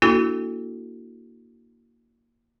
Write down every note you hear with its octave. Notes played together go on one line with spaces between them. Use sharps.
A#3 D4 E4 F#4 A4